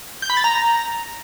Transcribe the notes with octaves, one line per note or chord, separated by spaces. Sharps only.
G6
B5
A6
A#5